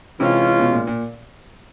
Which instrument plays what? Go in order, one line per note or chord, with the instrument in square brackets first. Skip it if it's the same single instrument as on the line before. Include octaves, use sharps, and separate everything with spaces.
[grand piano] C3 [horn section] E3 G#3 C#4 F4
[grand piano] B2
A#2
A#2